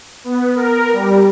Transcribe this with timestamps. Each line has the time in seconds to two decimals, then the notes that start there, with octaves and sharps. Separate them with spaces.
0.24 B3
0.55 A#4
0.92 G3